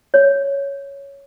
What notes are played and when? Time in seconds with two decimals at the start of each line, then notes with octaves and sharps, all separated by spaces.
0.14 C#5